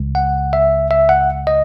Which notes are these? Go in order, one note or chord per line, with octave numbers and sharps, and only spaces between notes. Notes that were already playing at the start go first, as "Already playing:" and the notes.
Already playing: C#2 C#3 G#3
F#5
E5
E5
F#5
D#5